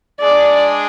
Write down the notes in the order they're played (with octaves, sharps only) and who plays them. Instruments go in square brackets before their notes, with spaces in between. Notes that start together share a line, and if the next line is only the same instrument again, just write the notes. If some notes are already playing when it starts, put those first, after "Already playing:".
[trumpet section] G#3 D4 G#4 [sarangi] D5